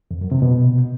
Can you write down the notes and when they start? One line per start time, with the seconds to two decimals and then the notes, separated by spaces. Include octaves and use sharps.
0.11 F2
0.21 F#2
0.32 C3
0.42 B2